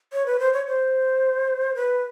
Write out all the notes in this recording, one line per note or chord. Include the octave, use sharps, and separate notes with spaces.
C#5
B4
C5
C#5
C5
B4